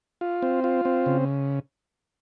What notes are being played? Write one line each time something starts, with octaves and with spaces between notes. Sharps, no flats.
F4
C4
F4
C4
C#3